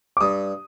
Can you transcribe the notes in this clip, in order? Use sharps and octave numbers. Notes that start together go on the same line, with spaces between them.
D6
G2 D#6